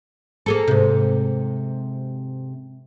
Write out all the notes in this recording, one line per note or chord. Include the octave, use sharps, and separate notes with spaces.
A#3 G#4 A4
G#2 C3